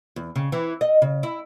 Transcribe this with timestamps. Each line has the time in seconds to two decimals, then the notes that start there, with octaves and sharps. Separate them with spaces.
0.16 E2
0.36 C#3
0.52 E3
0.81 D#5
1.02 C#3
1.23 E4